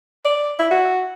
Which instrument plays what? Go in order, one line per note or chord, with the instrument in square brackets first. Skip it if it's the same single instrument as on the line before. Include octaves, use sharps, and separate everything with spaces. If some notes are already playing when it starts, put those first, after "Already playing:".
[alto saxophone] D5
E4
F#4